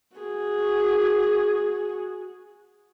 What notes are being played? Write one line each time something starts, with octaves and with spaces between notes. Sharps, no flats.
F#4 G#4